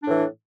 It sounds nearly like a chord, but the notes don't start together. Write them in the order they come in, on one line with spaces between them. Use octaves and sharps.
D4 A2 E3